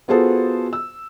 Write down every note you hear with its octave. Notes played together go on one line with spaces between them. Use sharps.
B3 F4 F#4 G#4 A4 C5
E6